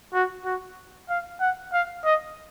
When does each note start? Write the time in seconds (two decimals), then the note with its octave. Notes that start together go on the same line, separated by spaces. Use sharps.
0.14 F#4
0.45 F#4
1.09 F5
1.41 F#5
1.73 F5
2.05 D#5